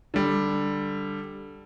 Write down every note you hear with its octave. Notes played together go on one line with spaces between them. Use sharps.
D3 G3